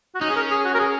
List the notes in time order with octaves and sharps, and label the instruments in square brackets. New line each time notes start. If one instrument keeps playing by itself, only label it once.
[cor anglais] F#4
[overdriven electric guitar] C#4 [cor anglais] D#4
[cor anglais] G#4
A#4
G#4
F#4
A#4
G#4